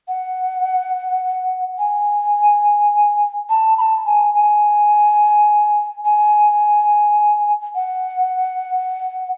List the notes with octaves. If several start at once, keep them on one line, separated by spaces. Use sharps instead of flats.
F#5
G#5
A5
B5
A5
G#5
G#5
G#5
F#5